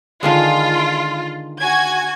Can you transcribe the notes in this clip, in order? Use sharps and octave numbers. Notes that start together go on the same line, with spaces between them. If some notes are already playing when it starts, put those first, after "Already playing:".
D3 D#3 G#3 F4
F#4 G#5 G#6